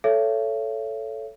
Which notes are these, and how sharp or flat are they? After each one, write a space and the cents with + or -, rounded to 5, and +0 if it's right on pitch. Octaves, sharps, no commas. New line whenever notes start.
A4 +0 C#5 +15 E5 +40